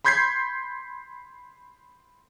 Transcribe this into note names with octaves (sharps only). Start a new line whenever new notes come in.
B5 C6 G6 G#6 B6 C7